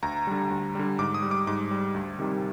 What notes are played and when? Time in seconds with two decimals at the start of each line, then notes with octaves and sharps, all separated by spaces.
0.02 D2 A#5
0.27 D3 G3
0.50 D2
0.75 D3 G3
0.99 G#2 D6
1.14 D#6
1.22 G3
1.31 D6
1.47 G#2 D6
1.71 G3
1.94 D2
2.19 C3 D#3 G3